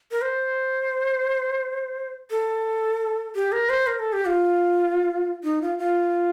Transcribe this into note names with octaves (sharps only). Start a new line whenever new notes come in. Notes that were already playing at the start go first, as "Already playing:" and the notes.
A#4
C5
A4
G4
A#4
C5
A#4
A4
G4
F4
D#4
F4
F4